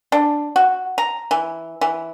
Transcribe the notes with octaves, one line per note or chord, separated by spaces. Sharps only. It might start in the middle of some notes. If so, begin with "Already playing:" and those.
D4
F#4
A#5
E3
E3